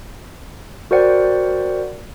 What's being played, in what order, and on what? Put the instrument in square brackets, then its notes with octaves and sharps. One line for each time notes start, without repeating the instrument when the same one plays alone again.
[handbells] F#4 A#4 C5 D5 F#5 G5